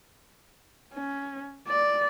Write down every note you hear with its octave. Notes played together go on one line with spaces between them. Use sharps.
C#4
D5